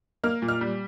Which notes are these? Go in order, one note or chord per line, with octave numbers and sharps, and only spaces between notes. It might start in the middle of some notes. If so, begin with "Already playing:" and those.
A#3 F6
A#2
F6
G3